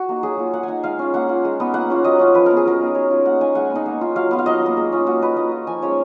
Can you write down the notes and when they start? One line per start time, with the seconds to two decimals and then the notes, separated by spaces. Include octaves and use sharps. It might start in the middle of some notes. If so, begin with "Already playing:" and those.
Already playing: F#4
0.09 A#3 D#4
0.23 F#3 G#4
0.38 A#3 F4
0.53 A#3 F#5
0.63 G#5
0.68 D#4 F#5
0.83 G#3 F5
0.99 C#4 F4
1.14 A#3 F#5
1.29 F4
1.45 G#3
1.60 B3 D#4
1.74 A#3 F#5
1.90 C#4 F4
2.04 F#3 D#5
2.19 C#4 F4
2.35 F3 B4
2.46 B3 F4 A#4
2.57 G#4
2.66 F#3 A#4
2.80 B3 D#4
2.95 F#3 C#5
3.10 C#4 F4
3.25 A#3 F#5
3.40 D#4 G#5
3.55 G#3 F#5
3.70 B3
3.75 D#4
3.86 A#3
4.01 F4
4.16 F#3 F5
4.31 B3 F4
4.39 F5
4.46 F#3 D#5
4.61 A#3 D#4
4.77 G#3
4.92 C#4 F4
5.06 A#3 F#4
5.22 D#4 B4
5.36 A#3 D#5
5.52 F4
5.67 F3 G#5
5.82 G#3 C#4 F4 C#5